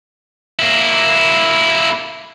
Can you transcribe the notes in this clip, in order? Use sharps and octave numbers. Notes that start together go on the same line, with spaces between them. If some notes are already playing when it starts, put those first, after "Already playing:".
A#3 E4